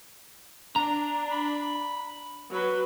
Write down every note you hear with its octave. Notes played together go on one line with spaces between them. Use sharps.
D4 A#5
B5
F#3 B4